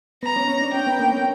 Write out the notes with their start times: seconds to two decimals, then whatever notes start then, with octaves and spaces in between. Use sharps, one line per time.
0.23 B3 A#5
0.36 C#4
0.48 C#4
0.61 D4
0.74 C#4 G5
0.87 B3
0.99 A#3
1.11 C#4